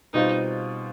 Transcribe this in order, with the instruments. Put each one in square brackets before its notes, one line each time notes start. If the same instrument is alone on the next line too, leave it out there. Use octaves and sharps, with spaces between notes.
[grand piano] B2 G3 C4 F4 [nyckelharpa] D#4